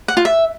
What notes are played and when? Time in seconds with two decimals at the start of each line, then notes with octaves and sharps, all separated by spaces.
0.08 F#5
0.17 F4
0.25 E5